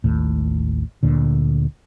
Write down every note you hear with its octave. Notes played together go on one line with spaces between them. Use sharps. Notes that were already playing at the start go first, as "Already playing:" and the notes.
A1 D#2 A2
D2 A#2 D3